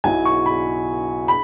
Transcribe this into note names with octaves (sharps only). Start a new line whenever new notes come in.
B1 B2 F#3 E4 G#5
C#6
B5
B5